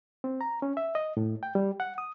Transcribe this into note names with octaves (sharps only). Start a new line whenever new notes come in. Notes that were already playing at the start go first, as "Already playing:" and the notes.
C4
A#5
C#4
E5
D#5
A2
G5
G3
F#5
D#6